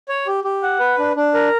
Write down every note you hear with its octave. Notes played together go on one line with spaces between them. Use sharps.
C#5
G4
G4
F#5
B4
D4
D4
A#4